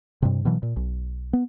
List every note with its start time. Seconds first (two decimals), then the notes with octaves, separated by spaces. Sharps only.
0.22 G2 C3
0.45 B2 E3 F#3
0.63 A#2
0.76 B1
1.33 B3